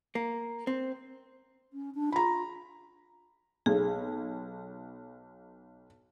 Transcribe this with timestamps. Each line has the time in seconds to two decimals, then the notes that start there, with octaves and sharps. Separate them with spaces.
0.15 A#3
0.67 C4
1.73 C#4
1.94 D4
2.12 F4 A#5 B5
3.66 B1 G#4